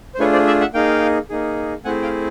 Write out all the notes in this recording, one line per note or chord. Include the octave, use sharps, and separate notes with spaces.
C5
A3 D4 F4 G#4 B4 C#5
C5 D5
D5 E5
E5 F#5
A#3 D#4 G#4 F5 G5
A#3 D#4 G#4
A3 C4 E4 G#4 F#5 G#5
F5 G5